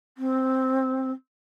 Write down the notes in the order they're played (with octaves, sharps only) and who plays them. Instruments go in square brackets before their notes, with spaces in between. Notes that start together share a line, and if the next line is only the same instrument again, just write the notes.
[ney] C4